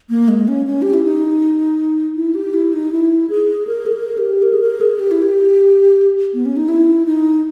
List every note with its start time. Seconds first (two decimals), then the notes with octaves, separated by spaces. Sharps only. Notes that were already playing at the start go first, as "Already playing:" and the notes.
0.10 A#3
0.28 G#3
0.48 C#4
0.66 C#4
0.82 G4
0.93 E4
1.04 D#4
2.16 E4
2.35 G4
2.54 E4
2.73 D#4
2.92 E4
3.30 G#4
3.67 A#4
3.86 G#4
3.92 A#4
4.18 G4
4.42 A#4
4.53 G#4
4.61 A#4
4.81 G#4
4.99 G4
5.11 E4
5.22 G4
6.34 B3
6.45 C#4
6.57 D#4
6.68 E4
7.06 D#4